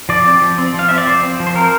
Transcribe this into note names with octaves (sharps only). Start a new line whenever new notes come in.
F3 D5
C4
F3
C4
F3 F5
C4 E5
D5
F3 C5
C4
F3
C5
C4 A#4